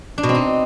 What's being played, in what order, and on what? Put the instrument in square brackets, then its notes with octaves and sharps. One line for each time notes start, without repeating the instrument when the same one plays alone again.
[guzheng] D4
B2
C4
D#4